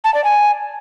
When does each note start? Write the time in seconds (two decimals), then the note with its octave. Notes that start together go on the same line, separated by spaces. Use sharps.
0.04 A5
0.14 D5
0.24 G#5